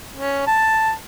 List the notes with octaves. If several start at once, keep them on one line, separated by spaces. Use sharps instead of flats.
C#4
A5